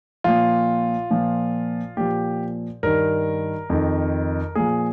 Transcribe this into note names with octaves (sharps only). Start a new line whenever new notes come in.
A#2 F3 F4
A#2 F3
A#2 F3 G4
G2 D#3 A#4
F2 D#3
A#2 F3 G#4